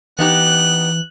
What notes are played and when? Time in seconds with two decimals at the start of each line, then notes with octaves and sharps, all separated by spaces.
0.19 E3 B3 D#4 G4 F#6